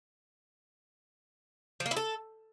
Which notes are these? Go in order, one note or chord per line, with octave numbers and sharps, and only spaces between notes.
F3
A#3
E4
A4